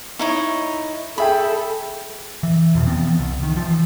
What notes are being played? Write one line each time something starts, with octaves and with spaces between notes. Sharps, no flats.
D#4 E4 C#5
G#4 A4 E5 G5 B5
E3
E2 B2 E3
E3 F3 B3 C4
C2
D#3
E3 F3